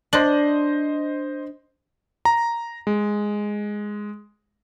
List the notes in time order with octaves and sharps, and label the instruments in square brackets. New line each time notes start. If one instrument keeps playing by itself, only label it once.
[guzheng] D4 [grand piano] C5 D#5 F#7
[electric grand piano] A#5
G#3